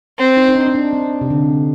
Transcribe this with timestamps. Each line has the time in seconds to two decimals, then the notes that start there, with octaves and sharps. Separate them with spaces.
0.18 C4
0.37 D#4
0.48 D#4
0.55 D4
0.68 D#4
0.75 D4
0.93 C4
1.21 C3
1.30 D3